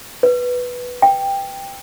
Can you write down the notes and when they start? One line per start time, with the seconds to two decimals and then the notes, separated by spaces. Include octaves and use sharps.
0.23 B4
1.02 G5